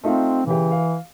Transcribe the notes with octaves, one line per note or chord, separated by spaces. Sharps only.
A3 C4 D#4 F4
C#3 E3 G4
F5